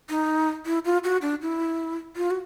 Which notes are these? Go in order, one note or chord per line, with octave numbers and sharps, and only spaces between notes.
D#4
E4
F4
F#4
D4
E4
F4
F#4